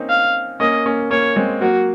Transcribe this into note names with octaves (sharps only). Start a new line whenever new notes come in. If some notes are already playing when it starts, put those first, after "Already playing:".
Already playing: A#3 C4 C#4 D#4
F5
A#3 C#4 D#5
A#3 C#4
A#3 C#4 C#5
G#3 C4
F#3 A#3 F#4